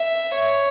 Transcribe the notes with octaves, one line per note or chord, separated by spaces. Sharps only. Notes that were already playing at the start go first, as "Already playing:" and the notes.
Already playing: E5
C#5